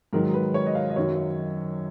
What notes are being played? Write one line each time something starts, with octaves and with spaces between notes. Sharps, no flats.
G#2 D#3 F#3 A#4
B4
C#5
D#5
F5
D#5
F#2 D#3 F#3 C#5